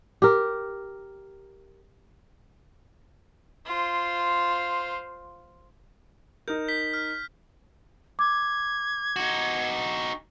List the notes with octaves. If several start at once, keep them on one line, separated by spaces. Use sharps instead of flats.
G4 A#4
F4 C5
D#4 A#4 G6
B6 G7
F6
D6 G#6
D#4 F#4